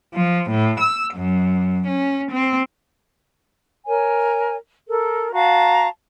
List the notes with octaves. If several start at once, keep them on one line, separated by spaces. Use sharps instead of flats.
F3
A2
E6
F#2
C#4
C4
A#4 C#5 G#5
A4 A#4
F#4 F5 A5 A#5